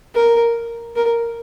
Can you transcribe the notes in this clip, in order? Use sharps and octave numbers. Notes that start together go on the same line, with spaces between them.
A#4
A#4